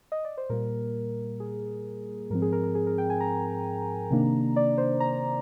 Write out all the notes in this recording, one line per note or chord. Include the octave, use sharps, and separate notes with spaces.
D#5
D5
C5
A#2 G3 A#3 A#4
G#4
G#2 F3 C4 A#4
G#4
A#4
A#4
G#4
A#4
G5
G#5
A#5
C3 D#3 A#3 D4
D5
C5
A#5